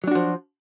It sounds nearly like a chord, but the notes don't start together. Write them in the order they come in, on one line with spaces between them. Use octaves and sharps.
F#3 D4 F#4 F3